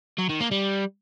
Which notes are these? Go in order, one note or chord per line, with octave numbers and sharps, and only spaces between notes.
F#3
D#3
A#3
G3